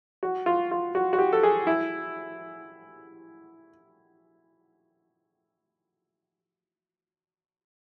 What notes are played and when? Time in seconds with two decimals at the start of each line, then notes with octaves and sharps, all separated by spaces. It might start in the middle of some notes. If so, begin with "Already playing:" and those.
0.23 F#4
0.46 F4
0.71 F4
0.95 F#4
1.13 F#4
1.18 G4
1.33 A4
1.43 G#4
1.67 E4